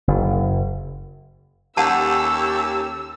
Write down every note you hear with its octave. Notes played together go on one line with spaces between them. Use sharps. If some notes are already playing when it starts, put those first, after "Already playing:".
F#1
D#2 C#4 G4 A4 F#5 A5 E6